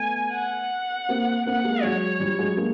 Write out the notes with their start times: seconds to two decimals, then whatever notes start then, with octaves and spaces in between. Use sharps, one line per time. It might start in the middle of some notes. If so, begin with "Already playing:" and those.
Already playing: A3 B3 G#5
0.33 F#5
1.09 A#3 C4
1.46 A#3 C4 F#5
1.64 G#3 A#3
1.83 F#3 G#3 C#5
2.20 F3 G3
2.39 F#3 G#3
2.57 G#3 A#3